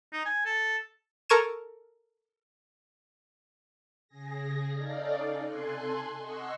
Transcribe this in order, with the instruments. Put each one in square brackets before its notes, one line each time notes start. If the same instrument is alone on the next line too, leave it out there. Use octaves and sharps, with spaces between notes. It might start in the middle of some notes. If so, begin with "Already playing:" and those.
[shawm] D#4
G#5
A4
[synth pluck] A4 A#4 C#6 G#6 D#7 E7
[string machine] C#3 G#4 A#6
C#4 D#4 A4 D5 F5
C3 A4 G#5 C6 F#6
D#5 F#5 C6 C#6 E6